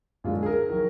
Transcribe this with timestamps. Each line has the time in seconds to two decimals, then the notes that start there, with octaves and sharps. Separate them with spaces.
0.24 F#2 D3 G#3 F4
0.43 G#4
0.46 A#4
0.69 D#3 F#3 A#4